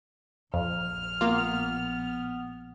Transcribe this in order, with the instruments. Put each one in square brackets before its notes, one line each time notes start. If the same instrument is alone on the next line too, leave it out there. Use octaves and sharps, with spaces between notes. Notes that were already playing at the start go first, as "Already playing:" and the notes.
[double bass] A#1 [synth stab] F2 [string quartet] F6
[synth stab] A#3 F4 [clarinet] B3